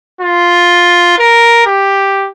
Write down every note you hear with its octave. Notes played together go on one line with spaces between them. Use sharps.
F4
A#4
G4